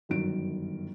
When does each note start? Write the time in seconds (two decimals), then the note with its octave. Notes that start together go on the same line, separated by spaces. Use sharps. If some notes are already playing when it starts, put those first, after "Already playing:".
0.09 G1 F#2 D#3 D7